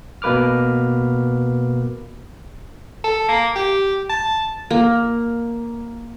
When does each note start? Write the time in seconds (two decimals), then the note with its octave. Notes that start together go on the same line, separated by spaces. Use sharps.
0.22 B2 A#3 B4 D6 F6
3.04 A4
3.28 A#3
3.55 G4
4.09 A5
4.71 A#3